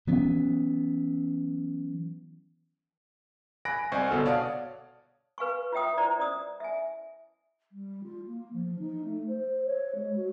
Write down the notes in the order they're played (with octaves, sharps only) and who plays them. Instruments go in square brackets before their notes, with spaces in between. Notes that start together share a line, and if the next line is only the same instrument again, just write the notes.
[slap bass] E3 F#3 B3 C#4
[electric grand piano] G#5 B5 F#6 A#6 D7
C2 C5 D5 D#5 G#5 C#6
G1 B2 F#4 A4 F6
C#5 D5 F5 F#5 A5 D#6
[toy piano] B4 F5 G#5 C#6
F4 C#5 E5 G5 D#6
E4 C5 D5 A#5
C#4 D5 D#6
E5 G#5
[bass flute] G3
F4
A#3
F3
D#4
A3
C5
C#5
G#3
F#4